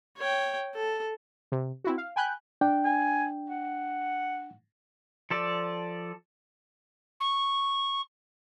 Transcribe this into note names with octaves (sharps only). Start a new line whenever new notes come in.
C#5 G5
A4
C3
C4 E4 F#4
F5
G5 G#5 B5 F#6 G6
D4 G5
G#5
F#5
F3 A4 D5
C#6